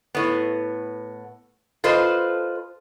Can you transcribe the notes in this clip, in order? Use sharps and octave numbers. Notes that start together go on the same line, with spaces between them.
A2 B3
F4 A4 B4 C5 D#5